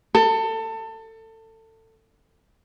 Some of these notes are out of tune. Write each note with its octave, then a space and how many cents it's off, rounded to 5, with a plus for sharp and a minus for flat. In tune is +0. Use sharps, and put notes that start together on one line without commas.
A4 +25